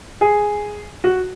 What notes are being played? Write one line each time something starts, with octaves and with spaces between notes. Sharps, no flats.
G#4
F#4